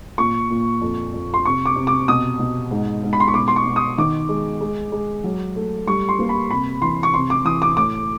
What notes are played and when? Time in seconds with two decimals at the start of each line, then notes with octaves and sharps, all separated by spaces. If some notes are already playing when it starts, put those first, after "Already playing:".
0.18 A#2 C#6
0.50 A#2
0.81 F2
1.14 F2
1.34 C6
1.45 C3 C#6
1.66 D6
1.76 C3
1.87 D6
2.08 B2 D#6
2.39 B2
2.71 G#2
3.03 G#2
3.13 B5
3.20 C6
3.28 C#6
3.34 B2 D6
3.48 C6
3.56 C#6
3.66 B2
3.76 D#6
3.98 D#3 D6
4.29 G#3
4.61 G#3
4.92 G#3
5.24 F#3
5.56 A3
5.87 G3 C#6
6.09 C6
6.19 A#3
6.29 B5
6.51 C3 B5
6.82 E3 C6
7.03 C#6
7.14 C3 C6
7.30 D6
7.45 E3 D#6
7.62 D6
7.77 A2 D6